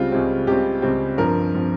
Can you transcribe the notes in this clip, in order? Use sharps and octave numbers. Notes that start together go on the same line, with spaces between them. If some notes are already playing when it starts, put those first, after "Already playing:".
Already playing: C#2 C#3 G3 C4 F4
C#2 C#3 G3 C4
C#2 C#3 G3 C4 G4
C#2 C#3 G3 C4
G2 F3 C4 A#4
F3 C4